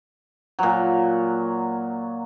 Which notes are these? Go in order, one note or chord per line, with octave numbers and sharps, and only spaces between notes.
A#2 F#3